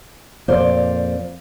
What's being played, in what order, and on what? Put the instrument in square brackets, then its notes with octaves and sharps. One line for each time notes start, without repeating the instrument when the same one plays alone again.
[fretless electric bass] F2 A#2 [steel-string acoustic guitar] C5 D5 F5